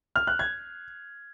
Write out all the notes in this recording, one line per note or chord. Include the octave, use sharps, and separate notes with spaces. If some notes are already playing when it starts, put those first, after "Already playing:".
F6
F#6
G#6